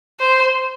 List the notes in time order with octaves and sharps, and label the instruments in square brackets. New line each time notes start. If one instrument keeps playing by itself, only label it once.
[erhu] C5